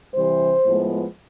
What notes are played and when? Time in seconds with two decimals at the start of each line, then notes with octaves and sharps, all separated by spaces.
0.14 C3 E3 G3 C5
0.64 A2 F3 G#3 B3